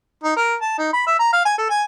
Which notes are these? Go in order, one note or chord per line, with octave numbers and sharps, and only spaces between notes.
D#4
A#4
A5
D#4
B5
E5
A#5
F5
G#5
A4
G#5